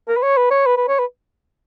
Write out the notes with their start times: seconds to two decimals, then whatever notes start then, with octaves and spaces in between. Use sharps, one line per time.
0.08 A#4
0.17 B4
0.23 C#5
0.37 B4
0.51 C#5
0.66 B4
0.77 B4
0.88 C#5
0.99 B4